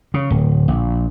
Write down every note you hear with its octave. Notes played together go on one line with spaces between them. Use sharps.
C#3
D1
A#1